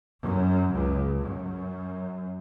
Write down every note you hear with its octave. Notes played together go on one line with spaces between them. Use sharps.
F#2
C#2
F#2